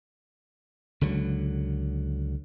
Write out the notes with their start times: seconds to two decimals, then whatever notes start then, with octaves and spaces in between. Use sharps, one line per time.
1.01 C#2 D3 F#3